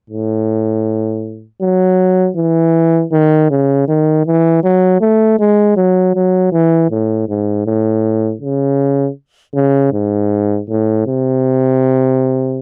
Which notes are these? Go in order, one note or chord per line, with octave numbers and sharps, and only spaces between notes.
A2
F#3
E3
D#3
C#3
D#3
E3
F#3
A3
G#3
F#3
F#3
E3
A2
G#2
A2
C#3
C#3
G#2
A2
C3